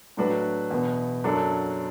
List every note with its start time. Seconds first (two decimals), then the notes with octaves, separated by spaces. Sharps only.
0.17 A2 F#3 D4 F#4 B4
0.70 E2 B2 B3
1.24 F#2 F#3 D4 A4